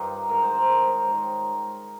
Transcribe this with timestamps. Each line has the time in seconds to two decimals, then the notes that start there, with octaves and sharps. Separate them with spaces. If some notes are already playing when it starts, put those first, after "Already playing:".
Already playing: G2 D#3 F4 C5
0.29 G#2 D#3 A#4
0.42 C5
0.55 C5
0.68 G#2 D#3 A#4
0.87 C#5
1.07 G#2 D#3 C5